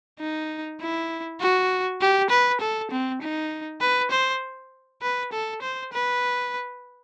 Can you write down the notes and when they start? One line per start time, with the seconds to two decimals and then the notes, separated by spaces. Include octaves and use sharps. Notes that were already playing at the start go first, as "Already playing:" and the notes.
0.20 D#4
0.81 E4
1.41 F#4
2.01 G4
2.31 B4
2.61 A4
2.91 C4
3.22 D#4
3.81 B4
4.11 C5
5.02 B4
5.33 A4
5.62 C5
5.93 B4